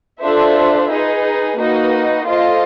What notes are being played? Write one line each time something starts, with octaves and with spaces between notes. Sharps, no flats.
D4 F4 A4 C5 E5
D#4 G#4 B4
A#3 D#4 F#4 B4
F4 A4 C5 D#5